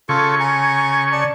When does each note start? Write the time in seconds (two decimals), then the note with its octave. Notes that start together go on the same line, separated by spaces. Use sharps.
0.09 C#3 F4 A4 C#6
0.40 G#5 A#5
1.12 D5 A5